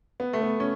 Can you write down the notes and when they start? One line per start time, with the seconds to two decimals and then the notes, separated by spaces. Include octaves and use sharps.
0.20 B3
0.33 A3
0.42 B3
0.60 C#4